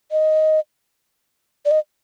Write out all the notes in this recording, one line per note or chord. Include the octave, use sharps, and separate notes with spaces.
D#5
D5
D#5